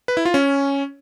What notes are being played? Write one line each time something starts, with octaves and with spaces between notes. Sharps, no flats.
B4
E4
F4
C#4